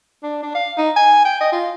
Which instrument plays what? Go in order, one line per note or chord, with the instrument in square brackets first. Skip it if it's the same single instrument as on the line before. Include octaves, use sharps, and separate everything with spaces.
[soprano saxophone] D4
D4
F5
D#4
G#5
G5
D#5
F4